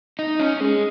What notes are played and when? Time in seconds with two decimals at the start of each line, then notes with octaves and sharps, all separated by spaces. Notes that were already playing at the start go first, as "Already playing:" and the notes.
0.19 D#4
0.40 C#4
0.61 G#3